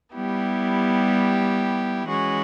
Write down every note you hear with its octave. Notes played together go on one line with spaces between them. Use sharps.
G3 B3 E4 G4
E3 G#3 C#4 F#4